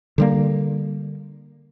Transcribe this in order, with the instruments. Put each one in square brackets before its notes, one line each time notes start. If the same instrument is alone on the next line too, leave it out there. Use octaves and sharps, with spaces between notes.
[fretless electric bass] D3 G3 A#3